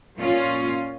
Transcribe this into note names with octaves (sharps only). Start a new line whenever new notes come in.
A#2 C#4 F4